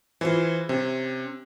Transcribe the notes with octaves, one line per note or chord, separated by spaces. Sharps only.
E3 F4 G#4 C5
C3 C#4 E5